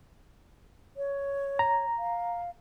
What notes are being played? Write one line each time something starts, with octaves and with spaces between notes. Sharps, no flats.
C#5
A#5
F5